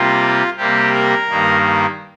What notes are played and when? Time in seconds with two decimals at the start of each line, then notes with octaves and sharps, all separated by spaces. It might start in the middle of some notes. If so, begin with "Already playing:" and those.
Already playing: C3 G3 A#3 F4
0.56 C3 G3 A#3 G4
0.93 A#4
1.29 G2 D#3 A#3